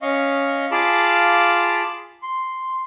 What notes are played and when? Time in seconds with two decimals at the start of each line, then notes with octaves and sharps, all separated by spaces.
0.02 C#4 D#5 F5 C#6
0.71 F4 G#4 F5 A5 B5 D6
2.22 C6